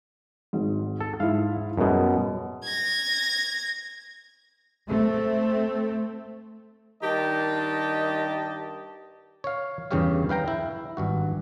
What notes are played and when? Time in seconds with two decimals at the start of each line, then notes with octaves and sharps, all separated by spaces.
0.53 G#1 G#2
1.00 A4
1.20 G#2 E4 F5
1.77 F#2 B2 G3 G#4
2.64 G#6 A#6
4.87 A3 C4
7.02 G2 D#3 G4 D#5 A5
9.44 C#5 F5
9.91 E2 G2 C#3 G4 C#5 F5
10.29 B4 F5 G5 A#5
10.48 E4
10.97 G#1 G2 F#4